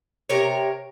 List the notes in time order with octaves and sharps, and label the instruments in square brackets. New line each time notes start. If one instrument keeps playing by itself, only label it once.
[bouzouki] C3 A#4 C#5